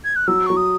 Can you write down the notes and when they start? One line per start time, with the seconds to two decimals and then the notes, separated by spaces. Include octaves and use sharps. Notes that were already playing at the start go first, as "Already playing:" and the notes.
0.04 G#6
0.16 F#6
0.28 F#3 E6
0.46 F#3 C#6
0.57 D#6